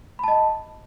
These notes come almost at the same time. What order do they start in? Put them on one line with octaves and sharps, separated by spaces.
B5 A5 D#5